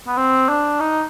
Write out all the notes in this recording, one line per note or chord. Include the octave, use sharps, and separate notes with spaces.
B3
C4
D4
D#4